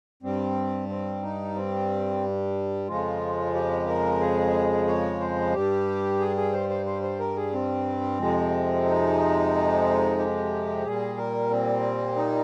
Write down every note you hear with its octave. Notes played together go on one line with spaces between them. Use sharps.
G2 G3 C4
C4
D#4
C4
F2 C#3 F3 G#3 F4
G4
A#4
G#4
C#5
C5
G2 G3 G4
G#4
G#4
C5
C5
C5
C5
A#4
G#4
C4
F2 C3 F3 G#3
D#4
G4
A#2 G3 G#4
A#4
C4
D#4